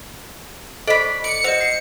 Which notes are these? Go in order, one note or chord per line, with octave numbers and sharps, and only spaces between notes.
A4 C5 D5 D#5 B5
D5 C#7
F#4 C5 D#5
C7